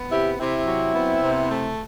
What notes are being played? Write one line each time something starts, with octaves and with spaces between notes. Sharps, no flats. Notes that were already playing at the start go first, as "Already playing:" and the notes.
Already playing: B3
C3 E4 G4
C3 C4 E4
F#3
B3
C3
A3